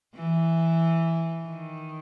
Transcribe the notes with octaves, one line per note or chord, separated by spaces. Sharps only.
E3
D#3